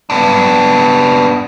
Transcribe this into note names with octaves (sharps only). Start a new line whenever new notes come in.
B3 D4